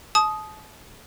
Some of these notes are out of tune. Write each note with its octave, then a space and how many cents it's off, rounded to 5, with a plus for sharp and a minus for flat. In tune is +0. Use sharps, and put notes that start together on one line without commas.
A5 -35 D#6 +0